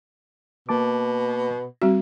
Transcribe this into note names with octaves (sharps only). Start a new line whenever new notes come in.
B2 A#3 A5 D6
G3 C4 F#4